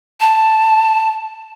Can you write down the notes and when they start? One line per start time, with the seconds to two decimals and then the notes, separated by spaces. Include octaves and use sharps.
0.21 A5